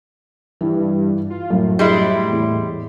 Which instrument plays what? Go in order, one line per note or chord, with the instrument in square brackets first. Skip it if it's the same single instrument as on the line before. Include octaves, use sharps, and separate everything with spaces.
[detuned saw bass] G2 [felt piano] E3
[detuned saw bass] F4
[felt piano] F#2 [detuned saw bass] A2
[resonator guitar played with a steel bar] G3 G#3 E4
[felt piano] E2